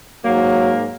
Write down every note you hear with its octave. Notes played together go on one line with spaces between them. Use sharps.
G#2 F#3 A#3